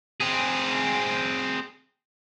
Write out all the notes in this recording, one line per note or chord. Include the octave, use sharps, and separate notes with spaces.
C4 G#4